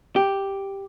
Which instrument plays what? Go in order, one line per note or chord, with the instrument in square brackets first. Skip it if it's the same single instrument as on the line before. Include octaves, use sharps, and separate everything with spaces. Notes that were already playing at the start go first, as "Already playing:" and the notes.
[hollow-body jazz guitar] G4